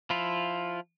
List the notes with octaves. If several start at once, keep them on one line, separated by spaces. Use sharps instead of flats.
F3 E4 F4